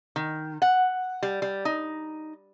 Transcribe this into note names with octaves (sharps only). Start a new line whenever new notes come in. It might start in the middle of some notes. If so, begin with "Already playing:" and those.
D#3
F#5
G3
G3
D#4